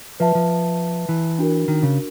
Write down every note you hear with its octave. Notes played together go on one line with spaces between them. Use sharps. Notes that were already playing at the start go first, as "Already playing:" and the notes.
F3 B4 E5 A5
F3
E3
D4 F#4 A#4
D#3
C#3